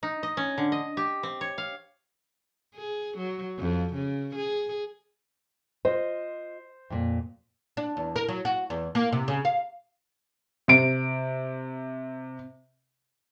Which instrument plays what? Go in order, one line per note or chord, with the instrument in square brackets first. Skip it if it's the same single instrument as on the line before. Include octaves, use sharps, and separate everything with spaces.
[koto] D#4
D#5
C#4
D3
D#5
G4
C4
C#5
F5
[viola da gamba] G#4
F#3
F2
C#3
G#4
[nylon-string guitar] F4 D#5 [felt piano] C5
[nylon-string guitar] F2 A#2
[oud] D4
E2
A#4
F#3
F#4
E2
A#3
C3
C#3
F5
[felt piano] C3 D7